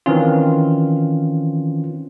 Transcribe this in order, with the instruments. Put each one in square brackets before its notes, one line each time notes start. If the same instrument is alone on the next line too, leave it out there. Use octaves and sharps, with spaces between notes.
[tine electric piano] D#3 E3 C4 C#4 F4